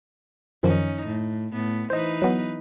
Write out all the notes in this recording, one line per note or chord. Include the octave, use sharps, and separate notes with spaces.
F#2 D#3 F3 C#4 D#4
A2
A2 B3
E3 D#4 B4 C5 D#5
F#3 B3